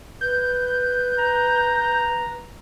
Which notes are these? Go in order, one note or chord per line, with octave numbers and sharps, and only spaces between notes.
B4 G6
A#5